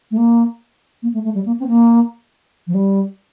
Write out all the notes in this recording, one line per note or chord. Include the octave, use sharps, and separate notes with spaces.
A3
A#3
A#3
A3
A3
G3
A#3
C4
A#3
F3
G3